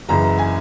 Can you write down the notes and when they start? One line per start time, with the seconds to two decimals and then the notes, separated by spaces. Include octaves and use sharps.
0.08 F#1 F#2 C#3 E3 A#5
0.24 A#5
0.38 G#5